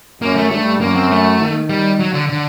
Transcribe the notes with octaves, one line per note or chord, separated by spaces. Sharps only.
F#2 A#3
A3
G2 A3
F#2 A#3
C4
A3
D#3
G3
F#3
D3
D3